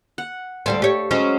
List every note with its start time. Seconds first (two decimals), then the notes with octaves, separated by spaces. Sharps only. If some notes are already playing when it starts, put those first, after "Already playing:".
0.18 F#5
0.66 D2 G3 C4 A4 F5
0.82 G4 C#5
1.11 F#3 G#3 C#4 C5